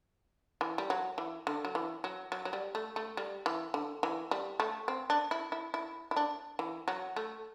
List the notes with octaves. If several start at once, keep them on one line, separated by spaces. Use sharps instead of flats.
E3
G3
F#3
E3
D3
F#3
E3
F#3
F#3
F#3
G3
A3
A3
G3
E3
D3
E3
G3
A3
C4
D4
E4
E4
E4
E4
D4
E3
F#3
A3